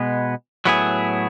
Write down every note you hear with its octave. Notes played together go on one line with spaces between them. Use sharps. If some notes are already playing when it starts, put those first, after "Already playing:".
Already playing: B2 G#3 B3
A2 F#3 B3 E4 G#4